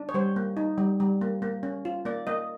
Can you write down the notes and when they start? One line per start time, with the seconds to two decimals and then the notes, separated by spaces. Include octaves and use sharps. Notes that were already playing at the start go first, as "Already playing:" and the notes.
Already playing: D4
0.09 C#5
0.14 G3 C5
0.36 A#3
0.57 D#4
0.78 G3
1.00 G3
1.21 A#3
1.42 A#3
1.63 C#4
1.85 F4
2.05 A#3 D5
2.27 A#3 D#5